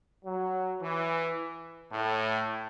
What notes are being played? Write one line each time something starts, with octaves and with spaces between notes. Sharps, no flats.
F#3
E3
A2